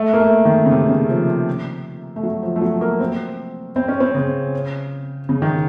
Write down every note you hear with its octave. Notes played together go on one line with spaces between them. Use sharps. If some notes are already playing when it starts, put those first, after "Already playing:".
Already playing: A3
A#3
A3
D#3
C#3
C3
C#3
F3
A3
F#3
F3
A3
F#3
A#3
C4
C4
C#4
C4
C#3
C#3
D#3